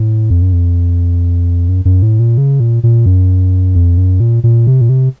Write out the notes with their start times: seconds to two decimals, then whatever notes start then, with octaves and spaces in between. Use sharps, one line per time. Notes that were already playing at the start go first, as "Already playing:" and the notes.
Already playing: A2
0.30 F2
0.42 F#2
0.53 F2
1.69 F#2
1.85 F#2
2.02 A2
2.19 A#2
2.38 C#3
2.60 A#2
2.83 A#2
3.06 F#2
3.75 F2
3.98 F#2
4.20 A#2
4.44 A#2
4.67 C3
4.81 A#2
4.89 C3